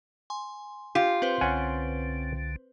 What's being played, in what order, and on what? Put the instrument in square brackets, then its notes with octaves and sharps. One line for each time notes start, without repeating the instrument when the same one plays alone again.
[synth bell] G#5 C6
[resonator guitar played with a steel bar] F4 [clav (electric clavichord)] G4
[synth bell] C4 B4 C5
[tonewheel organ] C2 D3 [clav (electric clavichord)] C#4 F#5 G#5